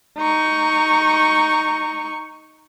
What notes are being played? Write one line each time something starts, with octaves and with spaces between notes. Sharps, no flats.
D#4 C#6